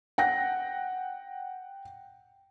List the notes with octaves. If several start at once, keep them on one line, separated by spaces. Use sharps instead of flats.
F#5 G5 A#6